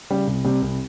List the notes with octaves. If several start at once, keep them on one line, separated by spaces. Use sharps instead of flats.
C#3 G3
C2
C3 G3
C2